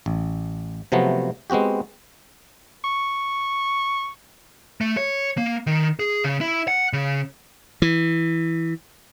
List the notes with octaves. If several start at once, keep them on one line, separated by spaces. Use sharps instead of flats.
A1
C3 F3 F#3 A3 B3
G#3 B3 C4 F#4 G4
C#6
A3
C#5
A#3
D#3
G#4
C#3
E4
F#5
C#3
E3